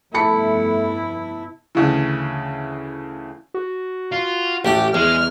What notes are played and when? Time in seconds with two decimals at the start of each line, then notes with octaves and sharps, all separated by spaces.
0.14 F1 G2 A3 B3 E4 A5 B5 C#7
1.75 D2 C#3 E3
3.54 F#4
4.12 F4
4.65 A1 A3 G4 D5
4.94 E2 G#3 F6